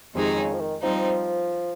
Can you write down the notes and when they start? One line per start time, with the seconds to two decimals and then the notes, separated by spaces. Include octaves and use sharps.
0.14 F2 C3 D#3 G#3 D#4 G#4
0.36 C#3
0.53 F3
0.59 D#3
0.82 F3 G3 C4 D#4